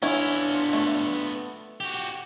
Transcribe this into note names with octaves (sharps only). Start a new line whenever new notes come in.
B3 C#4 D4 E4 F4
A3
F#4 G4